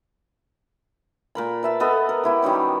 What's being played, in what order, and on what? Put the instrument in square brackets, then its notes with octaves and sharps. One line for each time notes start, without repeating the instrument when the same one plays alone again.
[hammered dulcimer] A#2 A#4 B5
B4 E5 A5
B3 A4 D#5
A#4
B3 E4 G4
D#3 F#3 G3 C#4